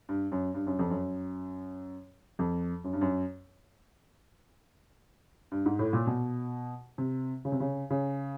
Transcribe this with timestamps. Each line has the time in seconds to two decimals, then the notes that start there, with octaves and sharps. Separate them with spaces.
0.09 G2
0.32 F#2
0.54 G2
0.67 F#2
0.79 F2
0.90 F#2
2.39 F2
2.84 F#2
2.93 G2
3.01 F#2
5.52 G2
5.66 G#2
5.79 A2
5.93 A#2
6.07 B2
6.98 C3
7.45 C#3
7.52 C3
7.60 C#3
7.90 C#3